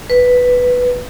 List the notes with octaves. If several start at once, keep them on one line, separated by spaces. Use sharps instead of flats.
B4